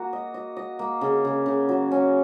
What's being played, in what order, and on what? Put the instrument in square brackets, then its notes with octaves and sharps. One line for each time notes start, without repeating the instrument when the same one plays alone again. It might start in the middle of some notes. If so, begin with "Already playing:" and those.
Already playing: [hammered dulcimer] A#3 F#4 A#4
D#5
D#5
D#5
A#3
C#3
C#3
C#3
F#3
C#4